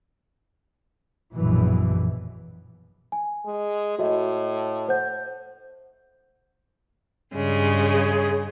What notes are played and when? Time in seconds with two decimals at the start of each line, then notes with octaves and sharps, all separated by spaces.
1.33 A#1 F#2 B2 E3
3.12 G#5
3.45 G#3
3.99 A2 F#4 D#5 E5
4.89 C5 F#5 G6
7.34 G2 C#3 G#3
7.91 G#4